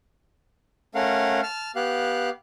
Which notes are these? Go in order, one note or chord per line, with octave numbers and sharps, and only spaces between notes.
A3 C#4 A#4 F5 F#5
A5 F6
B3 G4 F5 F#6